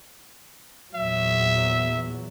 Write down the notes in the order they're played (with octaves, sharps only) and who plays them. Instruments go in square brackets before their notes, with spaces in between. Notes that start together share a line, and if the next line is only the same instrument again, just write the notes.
[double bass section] E2 A#2 F#3 [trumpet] E5